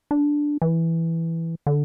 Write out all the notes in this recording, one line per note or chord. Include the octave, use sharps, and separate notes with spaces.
D4
E3
D3